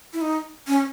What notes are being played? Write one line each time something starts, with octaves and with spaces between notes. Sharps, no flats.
E4
D#4
C#4